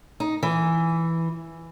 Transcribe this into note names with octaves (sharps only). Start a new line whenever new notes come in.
D#4
E3